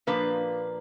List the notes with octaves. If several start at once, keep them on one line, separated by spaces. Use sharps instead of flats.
A#2 F3 A#3 D4 B4